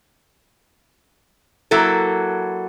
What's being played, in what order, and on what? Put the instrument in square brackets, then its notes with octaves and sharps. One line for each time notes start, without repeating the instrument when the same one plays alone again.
[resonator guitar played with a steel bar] F#3 A#3 E4 A4